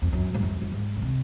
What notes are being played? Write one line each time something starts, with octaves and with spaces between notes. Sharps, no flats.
F2
F#2
G#2
F#2
F#2
G#2
C#3
C3